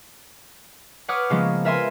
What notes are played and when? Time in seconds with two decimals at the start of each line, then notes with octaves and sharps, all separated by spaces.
1.08 B4 C#5 F#5 D6 D#6 F6
1.30 C#3 F3 G#3 A#3 B3
1.65 A#4 B4 E5 G#5 B5 C6